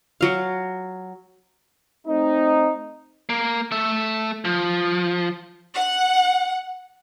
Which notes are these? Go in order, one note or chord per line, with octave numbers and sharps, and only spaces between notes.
F#3 F5
A3 C4 D#4
A#3
A3 E5
F3
F#5